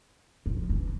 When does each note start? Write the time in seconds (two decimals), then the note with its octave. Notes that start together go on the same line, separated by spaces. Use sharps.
0.46 F3
0.69 E3